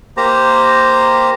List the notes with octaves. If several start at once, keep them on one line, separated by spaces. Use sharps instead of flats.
A#3 G4 C5 A#5